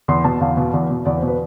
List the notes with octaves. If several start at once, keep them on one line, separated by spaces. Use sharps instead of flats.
E2 C6
B2 A5
E2 F5
B2
E2
B2
E2 D5
C5
B2 B4